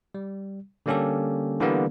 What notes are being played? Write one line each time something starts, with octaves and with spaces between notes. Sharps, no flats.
G3
D3 G3 A#3 C#4 G4 A4
D3 E3 G3 A#3 B3